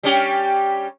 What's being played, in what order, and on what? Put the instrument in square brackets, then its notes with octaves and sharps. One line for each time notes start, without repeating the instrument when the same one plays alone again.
[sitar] G3 C#4 G4